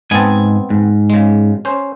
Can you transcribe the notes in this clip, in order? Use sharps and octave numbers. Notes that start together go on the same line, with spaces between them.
G#2 B3 C4 D#5 G#5 A5
G#2
C#3 G#3
C#4 C5